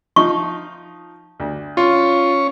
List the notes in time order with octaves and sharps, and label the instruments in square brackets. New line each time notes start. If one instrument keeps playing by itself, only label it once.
[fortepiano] F3 D#4 [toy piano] C#6
[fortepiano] D2
[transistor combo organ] C#4 C#5 [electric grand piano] F4